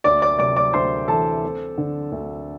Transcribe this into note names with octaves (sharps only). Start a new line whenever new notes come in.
D2 D5 D6
D5 D6
C3 D5 D6
D5 D6
D2 C5 C6
E3 A4 A5
C4
D3
D2